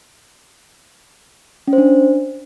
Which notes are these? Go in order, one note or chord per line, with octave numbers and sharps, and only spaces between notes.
C#4
C5
D4